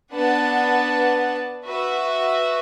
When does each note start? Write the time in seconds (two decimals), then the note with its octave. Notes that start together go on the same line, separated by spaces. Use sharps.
0.13 B3 D4 B4 F#5 A5
1.66 F#4 B4 E5